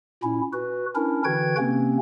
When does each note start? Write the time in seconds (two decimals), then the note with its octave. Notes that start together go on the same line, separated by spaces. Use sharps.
0.23 A#2 C#4 E4
0.53 F#4 B4
0.95 C#4 D4 E4 A#4
1.25 D3 E3 F#4 B4 G5 G#6
1.58 C3 A#3 C4 C#4